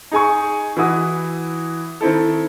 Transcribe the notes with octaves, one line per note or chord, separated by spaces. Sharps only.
D#4 G#4 G#5 C#6
E3 E4 F#4 D#6
D#3 C4 E4 A4